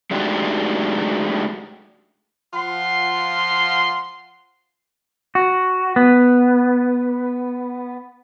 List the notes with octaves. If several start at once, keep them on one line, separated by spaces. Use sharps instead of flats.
G#3 A3 D4 D#4 F#4 G4
F3 F4 F#5 C6
F#4
B3